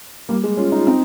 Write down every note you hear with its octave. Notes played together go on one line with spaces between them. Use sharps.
G3 A#3
G#3
C#4 F4
D#4
F4
C4 D#4